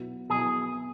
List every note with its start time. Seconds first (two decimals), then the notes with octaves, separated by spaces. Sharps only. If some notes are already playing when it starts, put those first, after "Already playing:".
Already playing: B2 F#3 B3 E4
0.30 B2 F#3 B3 E4 G#4